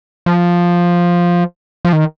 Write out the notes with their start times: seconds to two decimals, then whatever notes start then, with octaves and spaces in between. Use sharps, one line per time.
0.26 F3
1.85 F3
1.93 D#3